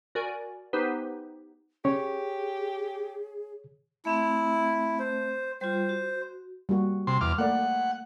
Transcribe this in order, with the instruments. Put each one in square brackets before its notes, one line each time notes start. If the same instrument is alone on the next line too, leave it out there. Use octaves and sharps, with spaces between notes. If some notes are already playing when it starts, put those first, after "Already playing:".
[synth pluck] F#4 A#4 D5 G#5
B3 D#4 G4 B4 C5
[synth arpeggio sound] C#4 [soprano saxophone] G4 [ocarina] G#4 [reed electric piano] C#5
[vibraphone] A3 C4 E5 [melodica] E4
[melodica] C5
[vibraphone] G3 F4 [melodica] C5
[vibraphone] F#4
[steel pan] G3 A#3 F#4
[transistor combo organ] C3 C6
E2 D6 F6
[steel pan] A3 A#3 D5 [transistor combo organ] F#5